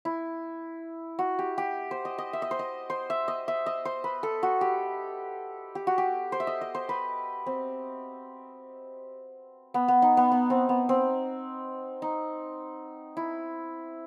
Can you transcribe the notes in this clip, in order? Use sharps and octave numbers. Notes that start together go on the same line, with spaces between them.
E4
F#4
G4
G4
C5
D#5
D#5
E5
D#5
C5
D#5
C5
E5
D#5
E5
D#5
C5
B4
A4
F#4
G4
G4
F#4
G4
C5
E5
D#5
D#5
C5
B4
C4
B3
B3
D#4
B3
B3
C4
B3
C4
D#4
E4